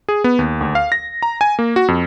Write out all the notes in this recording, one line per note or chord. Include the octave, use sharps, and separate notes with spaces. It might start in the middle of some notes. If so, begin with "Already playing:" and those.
G#4
B3
D#2
D2
F5
A#6
A#5
G#5
A#3
F#4
F2